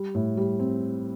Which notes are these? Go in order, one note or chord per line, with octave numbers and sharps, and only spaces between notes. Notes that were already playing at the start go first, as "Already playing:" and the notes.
Already playing: G3
A2
G3
C4